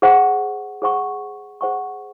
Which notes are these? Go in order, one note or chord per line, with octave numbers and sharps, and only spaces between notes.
G#4 C5 F#5 C#6
G#4 C5 F#5 C#6
G#4 C5 F#5 C#6